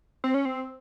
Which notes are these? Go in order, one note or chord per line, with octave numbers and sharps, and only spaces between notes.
C4
C#4
C4